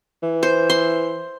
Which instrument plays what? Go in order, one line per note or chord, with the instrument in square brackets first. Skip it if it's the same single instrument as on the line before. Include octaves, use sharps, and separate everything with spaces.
[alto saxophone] E3
[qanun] C5
C6